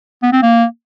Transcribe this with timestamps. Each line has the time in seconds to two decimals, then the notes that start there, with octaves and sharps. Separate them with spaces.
0.23 B3
0.32 C4
0.42 A#3